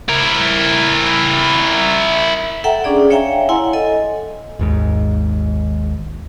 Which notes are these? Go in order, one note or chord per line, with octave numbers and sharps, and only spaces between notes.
E4 A#4
A4 E5 F#5 G5 A#5
C#4 D4 G#4 D5
C#5 E5 F5 G5 G#5 A#5
E4 F#5 G#5 C6
A4 D#5 G#5
G#1 D#2 G#2